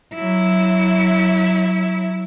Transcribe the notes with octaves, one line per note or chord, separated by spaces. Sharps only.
F#3 E4